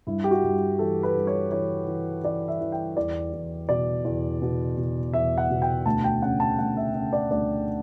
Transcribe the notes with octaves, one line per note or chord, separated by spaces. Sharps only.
G2 E4
G4
F#4
G2
E3 A4
B4
G2
C#5
E3 C#5
E3
E3 D5
E5
E3
G5
E2 D5
E2
B2 D5
E2
B2
B2
E2 E5
F#5
B2
G5
D2 A5
G5
C#3 F#5
A5
D2 F#5
E5
C#3 E5
D5
D2 D5